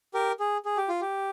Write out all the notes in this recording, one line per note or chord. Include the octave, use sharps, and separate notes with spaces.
G4 A#4
G#4
G#4
G4
F4
G4